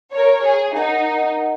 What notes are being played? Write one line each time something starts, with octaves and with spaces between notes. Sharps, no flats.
A#4 C#5
G#4
D#4 A#4 D#5 F#5